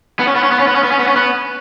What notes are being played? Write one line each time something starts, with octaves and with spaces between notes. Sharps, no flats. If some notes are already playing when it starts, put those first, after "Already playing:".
B3
C#4
B3
C#4
B3
C#4
B3
C#4
B3
C#4
B3
C#4
B3